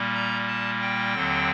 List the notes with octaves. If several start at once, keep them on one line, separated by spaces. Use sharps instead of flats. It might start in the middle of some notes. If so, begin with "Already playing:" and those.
Already playing: A#2 G3 A#3
A#5
A5
G5
D#2 D3 F#3 C4